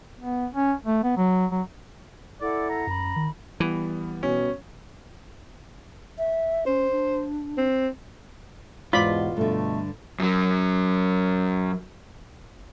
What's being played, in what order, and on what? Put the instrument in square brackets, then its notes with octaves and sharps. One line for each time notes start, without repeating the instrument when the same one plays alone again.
[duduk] B3
C#4
A3
B3
F#3
F#3
[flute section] E4 A4 F#5 [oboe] D5
[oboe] A#5
[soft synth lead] F#2 [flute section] B5
[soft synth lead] D#3
[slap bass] E3 [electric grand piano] G3 B3
[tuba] B2 [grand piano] C#4
[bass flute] E5
[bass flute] C#4 [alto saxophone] C5
[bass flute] D4
[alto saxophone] C4
[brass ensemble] E2 B2 [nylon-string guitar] G#2 [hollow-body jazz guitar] F4 [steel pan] D5 B5
[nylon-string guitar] G2 D3 [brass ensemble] B2 A3
[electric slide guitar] F#2 F#3